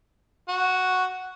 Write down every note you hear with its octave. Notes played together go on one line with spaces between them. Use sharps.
F#4